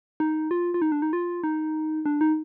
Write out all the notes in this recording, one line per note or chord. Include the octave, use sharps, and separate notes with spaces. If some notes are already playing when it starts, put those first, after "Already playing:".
D#4
F4
F4
D#4
D4
D#4
F4
D#4
D4
D#4